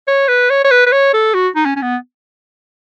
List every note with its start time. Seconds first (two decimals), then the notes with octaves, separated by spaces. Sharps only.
0.08 C#5
0.28 B4
0.50 C#5
0.64 C#5
0.71 B4
0.87 B4
0.92 C#5
1.13 A4
1.34 F#4
1.56 D#4
1.66 C#4
1.76 C#4
1.82 B3